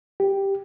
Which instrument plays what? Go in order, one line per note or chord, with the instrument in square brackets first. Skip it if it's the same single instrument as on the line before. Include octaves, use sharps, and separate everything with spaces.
[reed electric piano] G4